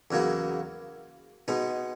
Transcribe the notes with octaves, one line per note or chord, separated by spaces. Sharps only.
E2 C#3 F#3 A#3 E4
B2 G#3 B3 D#4